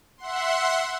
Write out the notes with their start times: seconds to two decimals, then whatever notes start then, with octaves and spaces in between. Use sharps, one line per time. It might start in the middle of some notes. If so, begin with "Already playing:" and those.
0.18 E5 F#5 C6